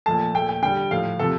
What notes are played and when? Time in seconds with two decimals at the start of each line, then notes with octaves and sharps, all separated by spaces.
0.06 A#2 F3 A3 A5
0.34 A#2 A3 G5
0.49 G5
0.63 D3 G3 G5
0.91 A2 F3 A3 F5
1.19 C3 F3 A3 A4